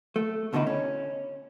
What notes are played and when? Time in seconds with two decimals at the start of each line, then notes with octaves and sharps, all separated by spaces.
0.16 A3
0.53 C#2 B2 D3 D#3 D#4 E4
0.67 C#4